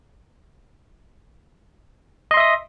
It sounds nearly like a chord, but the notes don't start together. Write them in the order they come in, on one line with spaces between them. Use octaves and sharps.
D#5 C6 E5 D#6